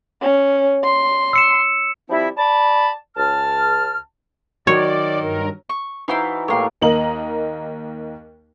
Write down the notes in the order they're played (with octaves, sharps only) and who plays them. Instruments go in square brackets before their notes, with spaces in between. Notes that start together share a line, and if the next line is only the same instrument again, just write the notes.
[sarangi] C#4
C6
[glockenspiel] E6 C#7 E7
[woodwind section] F3 G3 C4 E4
D5 A5 B5
C#2 A5 F6
[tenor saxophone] D#3 [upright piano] F#3 [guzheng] C#5 [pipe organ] D5
[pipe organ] G2 A#4
[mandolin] C#6
[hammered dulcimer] E3 D#4 F#4 [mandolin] E4 C5 F5
[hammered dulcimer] A2 A#3 G4 [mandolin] C#5 C6
[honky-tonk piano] D#2 A#3 D#5 A#5 F#7